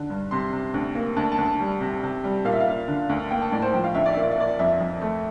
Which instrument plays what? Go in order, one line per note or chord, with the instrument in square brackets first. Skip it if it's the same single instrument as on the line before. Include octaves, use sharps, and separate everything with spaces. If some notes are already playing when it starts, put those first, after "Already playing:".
Already playing: [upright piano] D3
G2
C3 C6
C3
D2
A#3
D2 A5
A5
D2
A5
G3
C3
C3
G3
A#2 F5
E5
F5
A#2
D3
D2
A#3 G5
A5
A2 D5
C5
F3 G5
F5
D2 E5
D5
A#2 E5
D5
E5
A#2 D5
F2 E5
F2
A3